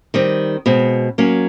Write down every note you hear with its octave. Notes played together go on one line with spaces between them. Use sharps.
D#3 G3 C4
B2 G#3 C4
F#3 A#3 C#4